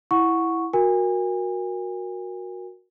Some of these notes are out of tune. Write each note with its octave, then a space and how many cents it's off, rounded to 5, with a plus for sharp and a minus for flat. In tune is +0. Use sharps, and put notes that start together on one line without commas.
E4 +0 F#5 -10 C#6 +0
F#4 -15 A#4 +0 G#5 -35